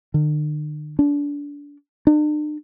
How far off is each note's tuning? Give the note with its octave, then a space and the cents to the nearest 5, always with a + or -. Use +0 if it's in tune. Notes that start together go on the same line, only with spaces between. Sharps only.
D3 +45
D4 -30
D4 +45